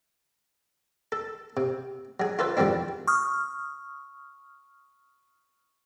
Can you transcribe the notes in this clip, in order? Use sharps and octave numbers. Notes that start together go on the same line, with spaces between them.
A4
C3
F#3 G#4
F4 A4 B4 C5
E2 D3 F3 G3 C4 D4
C#6 D#6 F6